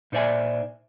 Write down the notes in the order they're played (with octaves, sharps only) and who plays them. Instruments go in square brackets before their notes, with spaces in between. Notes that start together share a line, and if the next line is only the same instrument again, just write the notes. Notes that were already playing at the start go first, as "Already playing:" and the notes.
[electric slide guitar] A#2 D#4 C5 D5 E5 G#5